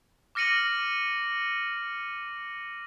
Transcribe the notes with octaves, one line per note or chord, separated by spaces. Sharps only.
D6 F6 A#6 C#7 D#7 F#7